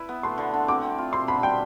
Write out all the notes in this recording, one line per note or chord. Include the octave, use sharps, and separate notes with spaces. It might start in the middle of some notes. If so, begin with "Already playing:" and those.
Already playing: E4 B4
B3
A3 C6
D3
D3
C4 D6
C4
F4
C4 C6
D3 B5
G3 G5